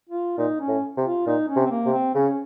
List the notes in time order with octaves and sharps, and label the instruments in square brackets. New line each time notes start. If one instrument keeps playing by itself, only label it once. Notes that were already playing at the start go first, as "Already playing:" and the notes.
[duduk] F4
[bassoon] A#2 [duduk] D#4
[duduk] C#4
[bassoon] A2
C3
[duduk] F4
[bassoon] A#2 [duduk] D#4
[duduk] C#4
[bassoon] C3
[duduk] C4
A#3
[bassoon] C3
[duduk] C4
[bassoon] C#3 [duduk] C#4